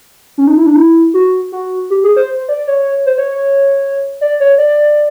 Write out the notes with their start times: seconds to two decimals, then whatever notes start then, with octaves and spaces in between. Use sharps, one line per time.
0.38 C#4
0.47 D#4
0.57 E4
0.66 D4
0.76 E4
1.14 F#4
1.52 F#4
1.90 G4
2.04 G#4
2.17 C5
2.29 C5
2.49 D5
2.67 C#5
3.06 C5
3.18 C#5
3.31 C#5
4.21 D5
4.40 C#5
4.58 D5